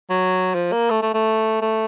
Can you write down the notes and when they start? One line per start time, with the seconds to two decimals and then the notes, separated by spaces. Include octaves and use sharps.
0.10 F#3
0.54 F3
0.73 A#3
0.90 A3
1.02 A3
1.14 A3
1.62 A3